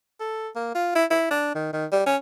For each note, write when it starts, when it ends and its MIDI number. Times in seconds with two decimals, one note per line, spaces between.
0.20 0.48 69
0.56 0.72 58
0.75 0.91 65
0.95 1.05 64
1.11 1.30 64
1.31 1.54 62
1.55 1.70 51
1.73 1.86 51
1.92 2.06 55
2.06 2.16 61